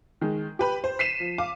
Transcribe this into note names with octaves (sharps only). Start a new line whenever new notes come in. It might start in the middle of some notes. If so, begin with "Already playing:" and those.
D#3 G#3
G4 B4 B5
C5
B6 C7 D#7 E7
F3
F5 D6